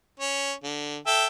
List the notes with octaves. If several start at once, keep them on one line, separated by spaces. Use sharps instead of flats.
C#4
D3
A4 E5 G5